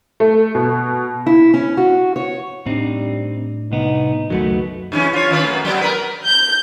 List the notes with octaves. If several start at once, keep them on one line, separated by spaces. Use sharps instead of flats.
A3
B2
E4
C#4
F#4
C#5
A2 G3 C4 D4 D#4
C2 B3 D#4
C#2 F#2 B2 D#3 F#3 A3 B3
G2 E3 C#4
F4 C#5
D#3 C#4 B4
F#2 A3
F#3 B3
A#4 B4
G6